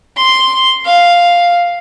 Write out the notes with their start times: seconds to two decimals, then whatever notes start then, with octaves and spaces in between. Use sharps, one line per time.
0.17 C6
0.84 F5